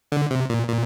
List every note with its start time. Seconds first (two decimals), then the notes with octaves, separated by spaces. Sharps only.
0.12 D3
0.31 C3
0.49 A#2
0.68 A#2